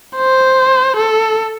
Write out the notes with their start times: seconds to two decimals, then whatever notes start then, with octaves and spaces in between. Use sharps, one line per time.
0.17 C5
0.97 A4